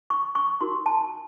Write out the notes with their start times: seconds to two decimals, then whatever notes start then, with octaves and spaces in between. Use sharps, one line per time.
0.10 C#6
0.35 C#6
0.61 D#4 F#4 A#4 C6
0.86 A5